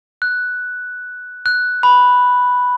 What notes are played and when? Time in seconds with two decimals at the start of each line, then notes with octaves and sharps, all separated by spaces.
0.22 F#6
1.46 F#6
1.83 B5